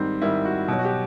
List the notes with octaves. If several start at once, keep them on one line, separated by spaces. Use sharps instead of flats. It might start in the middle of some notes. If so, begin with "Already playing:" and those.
Already playing: G#2 D#3 G3 C4
G#2 D#3 G3 E4
F#4
B2 F#3
F#4
G4